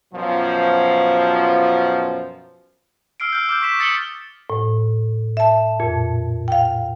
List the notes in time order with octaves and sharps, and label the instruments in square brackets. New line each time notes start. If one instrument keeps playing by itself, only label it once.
[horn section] F#2 B2 F3
[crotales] E6 F6 C7 D7
E6 F6 G6
D6 F6 G6
C#6 B6 E7
D#6 A6 C#7 F#7 G7
[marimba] A2
E5 A5
F2 A#2
F5 G5